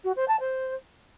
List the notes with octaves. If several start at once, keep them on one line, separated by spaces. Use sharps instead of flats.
F#4
C5
A5
C5